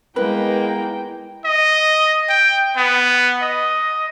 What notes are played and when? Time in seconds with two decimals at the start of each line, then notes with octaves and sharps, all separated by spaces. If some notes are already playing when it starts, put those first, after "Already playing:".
0.16 G#3 A#3 B3 E4 B4 G5
1.45 D#5
2.29 G5
2.77 B3
3.42 D#5